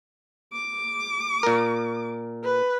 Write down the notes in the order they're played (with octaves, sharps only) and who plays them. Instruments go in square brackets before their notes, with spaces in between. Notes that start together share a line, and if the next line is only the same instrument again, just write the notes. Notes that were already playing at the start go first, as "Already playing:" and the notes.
[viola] D6
[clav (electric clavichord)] A#2 A#4
[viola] B4